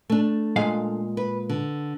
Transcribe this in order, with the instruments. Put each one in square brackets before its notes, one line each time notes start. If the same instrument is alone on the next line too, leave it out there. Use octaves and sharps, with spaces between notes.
[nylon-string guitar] A3 D4
[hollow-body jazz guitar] A#2 G#3 F5
[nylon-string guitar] B4
D3